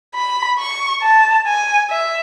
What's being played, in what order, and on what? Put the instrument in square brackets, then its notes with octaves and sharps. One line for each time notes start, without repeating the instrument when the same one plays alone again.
[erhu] B5
C#6
A5
G#5
E5